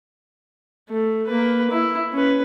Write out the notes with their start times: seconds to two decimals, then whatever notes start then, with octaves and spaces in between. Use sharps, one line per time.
0.89 A3
1.27 A#3 B4
1.71 E4
2.13 C#4 B4